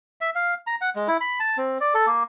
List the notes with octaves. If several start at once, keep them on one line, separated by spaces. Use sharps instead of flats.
E5
F5
A#5
F#5
G#3
E4
B5
A5
C4
D5
A4
A#3